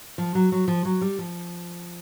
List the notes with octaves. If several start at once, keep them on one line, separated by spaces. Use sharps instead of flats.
F3
F#3
F#3
F3
F#3
G3
F3